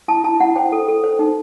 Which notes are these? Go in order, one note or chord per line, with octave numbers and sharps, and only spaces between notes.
E4 A5
E4 A5
E4 F#5
C5 G5
A4
A4
C5
D#4